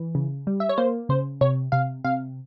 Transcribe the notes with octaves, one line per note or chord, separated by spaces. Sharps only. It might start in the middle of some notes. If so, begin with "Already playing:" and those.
Already playing: E3
C#3
G3
E5
C#5
A#3 C5
C#3 C5
C3 C#5
C3 F5
C3 F5